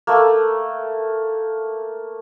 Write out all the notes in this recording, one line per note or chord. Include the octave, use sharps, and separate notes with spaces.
A3 A#3